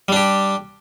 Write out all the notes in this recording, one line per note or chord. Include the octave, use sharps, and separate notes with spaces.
G3 D4 G4